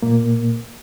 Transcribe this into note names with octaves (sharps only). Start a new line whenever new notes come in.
A#2 A#3